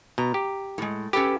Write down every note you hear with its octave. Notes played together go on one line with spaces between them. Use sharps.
B2 A#5
G4
A2 G#3
C#4 G4 A4 B4